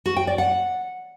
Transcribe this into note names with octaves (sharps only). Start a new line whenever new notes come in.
F#4
G5
D5
F#5